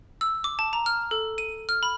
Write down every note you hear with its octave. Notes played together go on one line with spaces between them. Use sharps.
E6
D6
A5
A#5
F6
A4
D#7
F6
B5